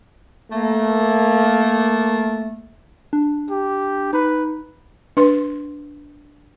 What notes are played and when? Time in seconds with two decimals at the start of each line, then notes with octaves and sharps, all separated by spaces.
0.52 A3 A#3
3.13 D4
3.50 G4
4.13 D#4 B4
5.17 D4 B4 C6